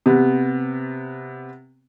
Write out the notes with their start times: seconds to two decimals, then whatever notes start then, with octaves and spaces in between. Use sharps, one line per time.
0.06 C3 B3